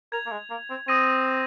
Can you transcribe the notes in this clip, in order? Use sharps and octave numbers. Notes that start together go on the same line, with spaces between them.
A#4 G#6 F7
A#3
G#3
A#3
C4
C4 D#6 A#6 D#7